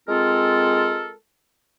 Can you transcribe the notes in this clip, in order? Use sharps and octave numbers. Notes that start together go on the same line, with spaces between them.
G#3 C4 F4 A4 A#4